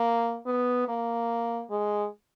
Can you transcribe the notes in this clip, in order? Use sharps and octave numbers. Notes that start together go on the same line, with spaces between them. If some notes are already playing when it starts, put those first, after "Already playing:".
Already playing: A#3
B3
A#3
G#3